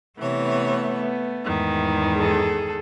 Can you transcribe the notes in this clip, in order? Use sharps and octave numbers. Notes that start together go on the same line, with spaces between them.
C3 E3 A3 B3 C#5
E2 G#2 D#3
G#4 A4